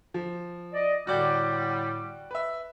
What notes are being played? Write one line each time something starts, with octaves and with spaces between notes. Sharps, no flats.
F3
D5 D#5
A2 D3 G3 F#4 D5 G5
B4 E5